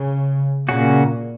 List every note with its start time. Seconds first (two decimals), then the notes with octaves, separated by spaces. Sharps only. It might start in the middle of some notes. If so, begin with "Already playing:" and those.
Already playing: C#3
0.68 A#2 C#3 A#3 C#4 F#4